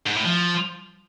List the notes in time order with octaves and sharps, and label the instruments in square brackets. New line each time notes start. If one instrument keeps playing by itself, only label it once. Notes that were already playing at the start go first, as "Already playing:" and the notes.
[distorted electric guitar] G#2
A2
F3